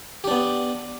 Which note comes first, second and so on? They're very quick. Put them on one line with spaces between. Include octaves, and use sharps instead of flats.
G4 D4 B3